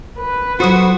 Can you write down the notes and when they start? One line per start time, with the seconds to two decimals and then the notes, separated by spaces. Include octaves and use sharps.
0.19 B4
0.60 F#3 F4 F#4 A4 C5 D#6